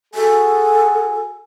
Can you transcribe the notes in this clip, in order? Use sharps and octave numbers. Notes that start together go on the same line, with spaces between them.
F#4 G#4 A4 G#5